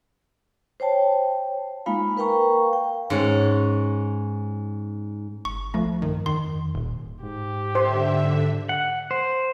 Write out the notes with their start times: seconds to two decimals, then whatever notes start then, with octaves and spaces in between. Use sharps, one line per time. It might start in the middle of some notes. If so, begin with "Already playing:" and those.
0.80 C5 C#5 G5 A5
1.86 G#3 A#3 D#4 F4 F5 B5
2.17 A#4 B4 F5 G5 A#5 C#6
2.73 G5
3.10 G#2 C#4 F#5
5.45 G1 C#6
5.74 B1 F3 A3
6.02 G2 D#3
6.26 F2 D#3 C6
6.75 D#1 A#2
7.23 G#2 G4
7.75 D3 C5 E5
8.69 F#5
9.11 C5